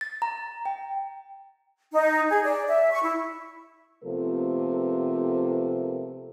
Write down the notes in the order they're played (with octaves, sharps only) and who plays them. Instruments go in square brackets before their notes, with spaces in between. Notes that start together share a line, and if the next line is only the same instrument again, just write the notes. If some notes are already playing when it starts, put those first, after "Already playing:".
[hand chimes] A6
A#5
G5
[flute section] D#4
G#4
D5
E5
C#6
E4
[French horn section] C3 F3 A3 B3 A4 A#4